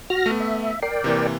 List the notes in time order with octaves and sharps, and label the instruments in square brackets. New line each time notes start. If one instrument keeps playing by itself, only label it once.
[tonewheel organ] F#4 F6 A#6
[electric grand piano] A3 B3
[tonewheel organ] E5
[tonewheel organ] A#4 D5 G5 [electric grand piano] C7
[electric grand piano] C3 E3 A#3